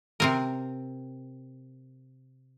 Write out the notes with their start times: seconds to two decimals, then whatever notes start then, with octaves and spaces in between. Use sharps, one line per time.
0.20 C3 C4 A#4